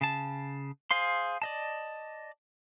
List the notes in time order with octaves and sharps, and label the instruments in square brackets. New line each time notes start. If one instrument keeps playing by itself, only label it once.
[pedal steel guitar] C#3 A5
G#4 C5 F5 C6
D5 D#5 A5